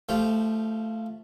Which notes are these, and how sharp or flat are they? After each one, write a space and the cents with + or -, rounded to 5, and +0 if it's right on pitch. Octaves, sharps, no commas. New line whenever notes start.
F3 -15 A3 +0 G4 +0